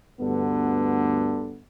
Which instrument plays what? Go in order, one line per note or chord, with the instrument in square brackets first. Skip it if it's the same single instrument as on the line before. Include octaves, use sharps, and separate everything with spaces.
[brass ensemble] D2 G2 D3 B3